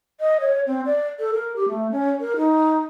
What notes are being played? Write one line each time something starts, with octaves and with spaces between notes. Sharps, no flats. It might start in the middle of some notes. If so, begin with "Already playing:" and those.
D#5
C#5
C4
D5
A4
A#4
G4
A3
C#4
A#4
D#4